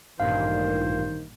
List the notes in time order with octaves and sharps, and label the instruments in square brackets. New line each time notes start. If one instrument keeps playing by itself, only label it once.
[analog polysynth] A1 G2 A#2 [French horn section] D#3 [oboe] C5 [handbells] F5